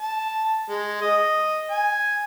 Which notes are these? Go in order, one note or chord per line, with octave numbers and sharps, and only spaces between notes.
A5
G#3
D#5
G#5